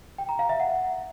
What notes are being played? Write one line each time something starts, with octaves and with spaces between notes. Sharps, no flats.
G5
A#5
F5
E5
F#5